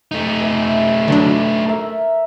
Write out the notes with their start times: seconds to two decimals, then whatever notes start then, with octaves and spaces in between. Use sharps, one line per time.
0.12 A3 D#4
0.40 B3 E5
1.08 D3 F#3 D4 B4
1.66 A#4 E5